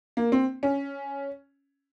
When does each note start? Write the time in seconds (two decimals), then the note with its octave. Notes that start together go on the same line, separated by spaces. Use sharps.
0.17 A#3
0.32 C4
0.63 C#4